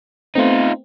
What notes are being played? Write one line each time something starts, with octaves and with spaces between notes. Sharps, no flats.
A3 B3 C4 D#4 F4